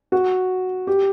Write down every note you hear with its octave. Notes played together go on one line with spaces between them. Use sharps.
F#4
G4